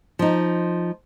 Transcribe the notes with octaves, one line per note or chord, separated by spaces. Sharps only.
F3 D#4